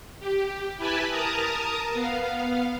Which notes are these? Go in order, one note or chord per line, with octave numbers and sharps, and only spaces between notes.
G4
E4 G4 B4 G#5 A5 B5
A#4 A5 A#5 D#6
B3 F5